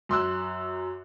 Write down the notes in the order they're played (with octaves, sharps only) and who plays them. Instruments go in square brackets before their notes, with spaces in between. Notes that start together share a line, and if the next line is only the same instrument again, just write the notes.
[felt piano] F#2 C6 E6 F#6